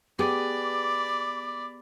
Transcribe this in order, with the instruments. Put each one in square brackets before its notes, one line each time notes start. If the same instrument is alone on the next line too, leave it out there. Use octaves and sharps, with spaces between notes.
[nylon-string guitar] B3 G4 G#4 [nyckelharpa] D5 B5 [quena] D6